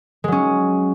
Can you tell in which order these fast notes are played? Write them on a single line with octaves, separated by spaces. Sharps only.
G#3 F#3 C#4